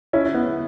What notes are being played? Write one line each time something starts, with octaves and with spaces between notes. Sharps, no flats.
C#4 E4
B3